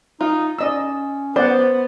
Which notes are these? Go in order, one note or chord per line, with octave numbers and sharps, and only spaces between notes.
D#4 F4
C#4 D5 D#5 E6
B3 C5 D5 F#5